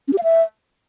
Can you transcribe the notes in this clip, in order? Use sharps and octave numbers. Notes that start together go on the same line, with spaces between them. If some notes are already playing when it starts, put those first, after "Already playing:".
C#4
G4
F5
E5